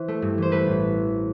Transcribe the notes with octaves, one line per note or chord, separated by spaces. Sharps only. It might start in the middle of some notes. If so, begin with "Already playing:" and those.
Already playing: E3 C5 E5
A3
G2
E3 C5
A3 B4
A1